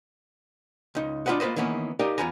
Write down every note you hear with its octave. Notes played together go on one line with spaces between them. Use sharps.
C#2 D#4
D4 F4 G#4 B4 D#5 F#5
A#3 F4 B4 C5 D#5
D#3 E3 A#3 B3 C#4
D#4 G4 A#4 D5 D#5 F5
E2 G2 F4 B4 G#5 A#5